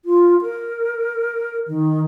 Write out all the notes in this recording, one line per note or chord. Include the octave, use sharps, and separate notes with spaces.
F4
A#4
D#3